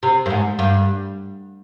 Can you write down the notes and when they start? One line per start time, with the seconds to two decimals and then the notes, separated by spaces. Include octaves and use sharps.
0.03 C3
0.26 G2
0.30 G#2
0.59 G2